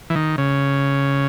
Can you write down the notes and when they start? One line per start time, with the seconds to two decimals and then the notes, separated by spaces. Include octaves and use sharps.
0.10 E3
0.16 D#3
0.38 C#3